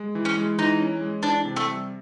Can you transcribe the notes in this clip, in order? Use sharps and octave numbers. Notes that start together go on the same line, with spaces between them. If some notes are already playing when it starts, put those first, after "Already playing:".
Already playing: G#3
E3
C#4
G#3
E3 D#4
C#4
G#3
E3 D4
C3
A3
G3